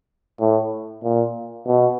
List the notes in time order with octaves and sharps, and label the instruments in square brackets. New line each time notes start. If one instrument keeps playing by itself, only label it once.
[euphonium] A2
A#2
B2